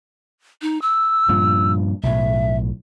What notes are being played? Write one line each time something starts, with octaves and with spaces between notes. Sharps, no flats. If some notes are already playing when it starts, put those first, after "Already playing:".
D#4
E6
G2 A#2 F3
B1 A2 E5